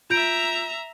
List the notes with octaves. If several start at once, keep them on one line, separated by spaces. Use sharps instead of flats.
F4 E5 A#5 G6 D7